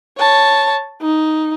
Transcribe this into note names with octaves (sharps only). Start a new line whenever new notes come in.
C#5 A5
D#4